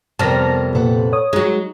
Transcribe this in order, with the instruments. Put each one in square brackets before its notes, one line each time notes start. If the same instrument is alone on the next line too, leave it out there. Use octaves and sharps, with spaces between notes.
[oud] F2 C3 [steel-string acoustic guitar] G3 B3 A#4 [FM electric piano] A5 F6 A#6
[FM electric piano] A#2 [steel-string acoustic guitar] A4 B4 F#5
[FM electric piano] C#5 D#6
[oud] F#3 G#3 [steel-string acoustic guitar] D#4